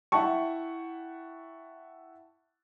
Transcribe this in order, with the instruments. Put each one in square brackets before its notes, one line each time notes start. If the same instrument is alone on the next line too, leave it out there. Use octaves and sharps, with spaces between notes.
[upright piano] E4 E5 F#5 G5 A5 C#6